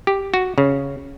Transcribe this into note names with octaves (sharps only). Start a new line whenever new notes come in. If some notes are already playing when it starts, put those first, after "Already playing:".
G4
F#4
C#3